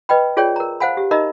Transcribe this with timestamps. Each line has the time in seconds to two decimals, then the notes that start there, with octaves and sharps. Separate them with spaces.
0.09 B4 D#5 G5 B5
0.37 F4 G#4 C#5 D5 G5
0.56 A#4 A#5
0.80 C5 F5 F#5 G#5 B5
0.97 G4
1.11 D#4 A#4 D#5 E5 A#5 B5